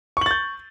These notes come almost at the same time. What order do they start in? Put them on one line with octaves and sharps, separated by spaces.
C#6 F#7 A6 G6